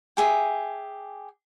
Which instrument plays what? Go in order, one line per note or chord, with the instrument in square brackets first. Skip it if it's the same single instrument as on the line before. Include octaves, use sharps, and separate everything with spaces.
[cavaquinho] G4 G#4 E5